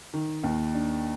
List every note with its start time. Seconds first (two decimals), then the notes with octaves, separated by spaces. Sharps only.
0.13 D#3
0.44 D#2
0.74 D4